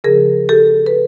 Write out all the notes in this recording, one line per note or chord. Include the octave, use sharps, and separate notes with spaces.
C#3 F3 G#4 A#4
G4 A4
B4